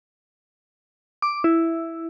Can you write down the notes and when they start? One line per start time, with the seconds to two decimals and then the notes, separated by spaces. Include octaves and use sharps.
1.22 D6
1.44 E4